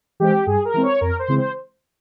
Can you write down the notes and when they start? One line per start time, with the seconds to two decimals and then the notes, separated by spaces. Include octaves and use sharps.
0.20 E3 G#3 C4 G4
0.46 G2 G#4
0.65 A#4
0.74 E3 G#3 C4
0.83 C#5
1.01 F2 A#4
1.19 C5
1.28 C#3 E3 G#3 C4
1.38 C5